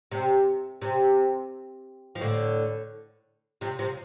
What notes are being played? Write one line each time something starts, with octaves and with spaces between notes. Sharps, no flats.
C3
C3
F3
A2 D3
C3 F3
C3 F3